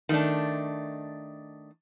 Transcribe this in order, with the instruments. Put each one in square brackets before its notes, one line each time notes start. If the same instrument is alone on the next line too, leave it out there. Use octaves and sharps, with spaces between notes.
[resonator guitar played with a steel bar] D#3 A3 D4